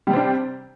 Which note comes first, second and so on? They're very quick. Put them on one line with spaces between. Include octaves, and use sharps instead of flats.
G3 C3 C4 D4